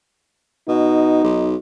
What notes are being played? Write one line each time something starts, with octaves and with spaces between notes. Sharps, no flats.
B2 D#4
B1